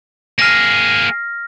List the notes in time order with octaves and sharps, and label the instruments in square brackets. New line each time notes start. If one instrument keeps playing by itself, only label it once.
[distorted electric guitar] A#3 G#4 [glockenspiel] F6 A#6